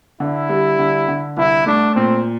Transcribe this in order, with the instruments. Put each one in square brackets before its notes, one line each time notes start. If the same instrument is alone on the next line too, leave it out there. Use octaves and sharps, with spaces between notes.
[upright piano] D3 [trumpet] E4
[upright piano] G3
D3
D3
[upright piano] C2 [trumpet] E4
[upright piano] A3 [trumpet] D4
[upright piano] A#2 [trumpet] C4